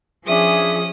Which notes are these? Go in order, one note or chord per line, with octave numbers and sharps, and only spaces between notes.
F3 C#4 D4 G#4 E5 D#6